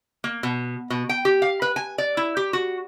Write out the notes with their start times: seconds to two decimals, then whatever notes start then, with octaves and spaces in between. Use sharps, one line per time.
0.24 A#3
0.43 B2
0.90 B2
1.09 G5
1.25 G4
1.42 F5
1.62 B4
1.76 G#5
1.98 D5
2.17 E4
2.37 G4
2.53 F#4